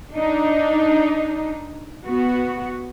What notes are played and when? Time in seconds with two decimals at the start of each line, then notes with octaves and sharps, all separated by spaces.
0.12 D4 D#4
2.06 B3 F#4